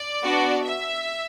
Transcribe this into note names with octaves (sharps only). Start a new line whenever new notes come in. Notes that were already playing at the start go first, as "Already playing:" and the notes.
Already playing: D5
B3 D4 F#4
E5